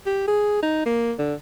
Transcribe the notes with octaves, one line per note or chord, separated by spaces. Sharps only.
G4
G#4
D#4
A#3
D3